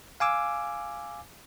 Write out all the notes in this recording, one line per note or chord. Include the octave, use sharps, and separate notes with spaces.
F5 G#5 D6 E6